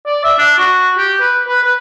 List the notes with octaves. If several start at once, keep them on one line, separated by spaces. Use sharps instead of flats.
D5
E5
D4
F#4
G4
B4
B4
B4